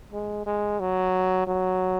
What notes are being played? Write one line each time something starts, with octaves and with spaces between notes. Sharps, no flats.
G#3
G#3
F#3
F#3